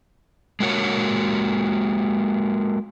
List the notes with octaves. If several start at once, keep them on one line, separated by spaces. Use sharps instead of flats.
G#3 A#3 F#4 C#5